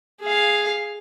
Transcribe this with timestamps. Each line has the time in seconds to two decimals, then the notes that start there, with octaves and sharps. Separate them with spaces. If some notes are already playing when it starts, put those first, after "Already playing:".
0.20 G#4 F5